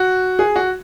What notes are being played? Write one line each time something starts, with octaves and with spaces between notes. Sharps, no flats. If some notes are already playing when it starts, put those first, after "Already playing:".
Already playing: F#4
G#4
F#4